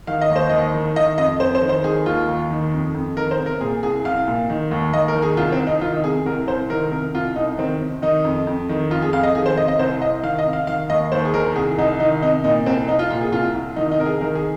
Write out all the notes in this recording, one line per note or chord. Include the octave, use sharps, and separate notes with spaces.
D#3 F5
D#5
D#2
C5
D#2 D#5
D#3
D#3 D#5
F2 D#5
F2 C5
C5
D#3
C5
D#3 G#4
D#2 F4
D#2
D#3
F2
F2
D#3 A#4
C5
C3
A#4
A#2 G#4
C2 G#4
C2 F5
A#2
D#3
D#2
D#2 D#5
A#4
D#3
G#4
C2 F4
C4
C2
D#4
D#3 F4
D#4
C3 G#4
C2 A#4
C2 C5
D#3 A#4
C3 A#4
C2 F4
C2 D#4
D#3 C4
C3
D#3 D#4
F2
F2
D#3
F2 F4
G#4
F2 F5
D#5
D#3 G#4
C5
C3 D#5
D#5
C2 C5
C2 D#5
D#3 F5
D#5
C3
F5
D#3 F5
D#2 D#5
D#2 C5
G#4
D#3 A#4
C2 G#4
C2 D#4
D#3 D#4
C3 D#4
A#2 D#4
C2 C4
C2 D#4
F4
A#2 F4
G#4
C2 F4
C2
D#3 D#4
D#4
C3 A#4
G#4
D#3 A#4
G#4